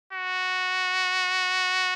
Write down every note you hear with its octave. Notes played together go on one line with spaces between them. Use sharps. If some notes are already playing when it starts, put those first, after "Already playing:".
F#4